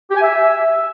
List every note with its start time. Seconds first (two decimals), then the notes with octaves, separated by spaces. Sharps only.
0.10 G4
0.16 G#5
0.22 E5